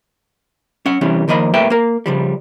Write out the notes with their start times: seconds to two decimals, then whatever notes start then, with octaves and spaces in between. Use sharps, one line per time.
0.86 C#4 F#5
1.01 C3 E3 G3 C#4
1.28 D#3 F3 A#3 D#5 B5
1.54 C2 A3 A#3 B4 E5 G5
1.70 A#3 A#4
2.06 C#3 F3 G3